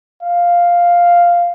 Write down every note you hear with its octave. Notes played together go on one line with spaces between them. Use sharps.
F5